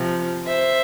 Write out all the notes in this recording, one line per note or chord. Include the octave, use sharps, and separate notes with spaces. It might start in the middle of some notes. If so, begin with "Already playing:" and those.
Already playing: C3 F3
C5 E5